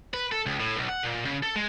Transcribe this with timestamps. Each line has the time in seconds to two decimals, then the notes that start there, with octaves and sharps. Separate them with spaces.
0.14 B4
0.32 A4
0.46 C#2
0.60 A2
0.76 B1
0.89 F#5
1.03 A#2
1.25 C#3
1.43 A4
1.56 G#3